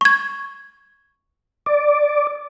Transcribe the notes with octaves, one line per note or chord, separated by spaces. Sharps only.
C#6 G#6
D5